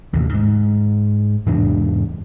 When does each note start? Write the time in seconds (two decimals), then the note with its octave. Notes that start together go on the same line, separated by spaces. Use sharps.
0.13 A1 D#2 C3 D#3
0.34 G#2
1.46 E2 G#2 C3 D4